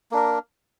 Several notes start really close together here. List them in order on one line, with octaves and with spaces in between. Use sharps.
A#3 D4 A#4